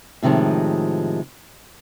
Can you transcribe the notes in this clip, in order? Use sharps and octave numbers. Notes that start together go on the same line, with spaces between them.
A2 C3 D#3 F3 G#3